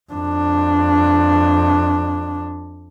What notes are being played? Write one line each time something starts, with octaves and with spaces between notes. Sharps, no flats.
F2 D4